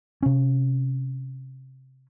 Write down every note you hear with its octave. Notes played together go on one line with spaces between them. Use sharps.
C3 C#4